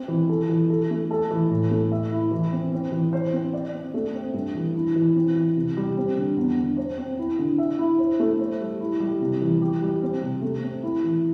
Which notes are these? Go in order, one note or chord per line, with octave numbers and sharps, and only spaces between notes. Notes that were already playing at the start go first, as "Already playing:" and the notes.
Already playing: C4
E3
A4
E3
A4
A3
A4
E3
A2
A3
E5
E4
E3
C4
C4
E3
C5
C4
D5
C4
A3
C4
G2
E3
E4
E3
C4
E3
C3
G3
C4
D3
E2
D3
C5
C4
E4
D3
E5
E4
C5
A3
C5
G3
E4
G3
C3
E3
G4
G3
C4
C3
A3
C4
E4
E3